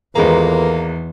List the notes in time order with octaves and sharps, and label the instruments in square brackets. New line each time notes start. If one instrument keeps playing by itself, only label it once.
[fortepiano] G#1 G#3 A#5 [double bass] E2 [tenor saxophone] A#3 [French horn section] F4 A4 B4